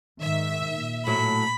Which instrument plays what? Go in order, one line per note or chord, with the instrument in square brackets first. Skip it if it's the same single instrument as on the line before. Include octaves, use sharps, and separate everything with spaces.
[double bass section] G#2 D#3 [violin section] E5
[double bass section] A#2
[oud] A2 F#3 [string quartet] B5